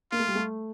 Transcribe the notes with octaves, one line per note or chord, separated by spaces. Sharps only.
A#3 F4
A3
G3
A3